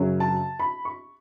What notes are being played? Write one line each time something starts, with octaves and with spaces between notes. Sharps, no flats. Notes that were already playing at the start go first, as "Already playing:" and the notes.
Already playing: F#2 C#3 F#3 C#4
A5
B5
C#6